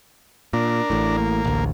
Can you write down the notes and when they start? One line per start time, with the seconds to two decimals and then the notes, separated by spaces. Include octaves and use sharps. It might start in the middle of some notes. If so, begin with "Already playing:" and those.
0.53 A#2 D4 A#4
0.90 A1 A2
1.17 A#3
1.44 A1 D2